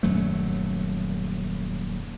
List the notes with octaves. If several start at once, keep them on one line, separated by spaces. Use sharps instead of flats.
D#1 F#2 F#3 A3